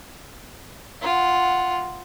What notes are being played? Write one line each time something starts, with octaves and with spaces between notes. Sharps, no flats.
F4 F#5